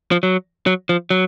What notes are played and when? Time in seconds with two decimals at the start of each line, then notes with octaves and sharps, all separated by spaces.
0.11 F3
0.23 F#3
0.66 F#3
0.89 F3
1.10 F#3